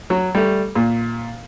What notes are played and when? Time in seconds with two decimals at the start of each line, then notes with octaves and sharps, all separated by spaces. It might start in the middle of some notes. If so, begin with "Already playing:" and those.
0.10 F#3
0.35 G3 A3
0.75 A#2